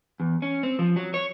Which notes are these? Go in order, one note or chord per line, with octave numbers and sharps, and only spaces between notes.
E2
C#4
C4
F3
F#3
C#5